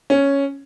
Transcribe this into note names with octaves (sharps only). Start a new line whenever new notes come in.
C#4